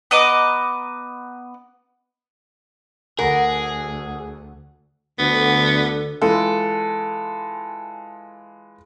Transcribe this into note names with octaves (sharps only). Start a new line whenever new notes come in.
B3 D#5 A#5 D6
D2 G#4 A#4 F#5
D2 D3 B3
E3 G#3 F4 A4